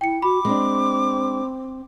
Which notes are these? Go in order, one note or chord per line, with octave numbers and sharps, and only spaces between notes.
E4 G5 C#7
F#4 B5 D6
G#3 C4 D4